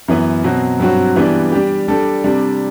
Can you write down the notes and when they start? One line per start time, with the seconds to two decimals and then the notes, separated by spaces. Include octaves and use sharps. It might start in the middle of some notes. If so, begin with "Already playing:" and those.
0.08 F#2 E3 B3
0.44 B2 F#3 C4 F#4
0.80 G2 F#3 C4 F#4
1.16 E3 G3 B3 D4
1.52 G3 D4 G4
1.88 G3 D4 A4
2.24 C3 G3 D4